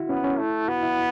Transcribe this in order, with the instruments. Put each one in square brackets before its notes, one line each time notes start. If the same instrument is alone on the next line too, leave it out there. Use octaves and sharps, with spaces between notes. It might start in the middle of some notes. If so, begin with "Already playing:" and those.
Already playing: [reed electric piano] E4 F#4
[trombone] B3 [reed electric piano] C#4
[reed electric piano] C#4
[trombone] A3 [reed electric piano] E4
[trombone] B3 [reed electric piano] F#4
[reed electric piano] E4